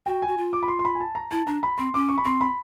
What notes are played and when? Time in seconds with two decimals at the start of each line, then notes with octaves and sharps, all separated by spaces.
0.06 F#4 G5
0.22 G#5
0.28 F#4
0.37 F4
0.53 D6
0.63 B5
0.68 C6
0.79 C6
0.85 B5
0.95 G#5
1.00 A5
1.15 A#5
1.31 E4 A5
1.47 D4 A#5
1.63 B5
1.78 C4 C6
1.94 C#4 D6
2.09 C#6
2.18 B5
2.24 C4 C6
2.41 B5